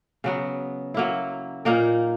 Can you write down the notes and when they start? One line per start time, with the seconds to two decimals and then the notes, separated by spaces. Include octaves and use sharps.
0.24 C#3 F#3 B3
0.94 F#3 A#3 E4
1.65 A#2 A#3 D#4 A#4